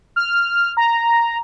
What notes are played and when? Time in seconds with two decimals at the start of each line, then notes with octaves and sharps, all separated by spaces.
0.16 F6
0.77 A#5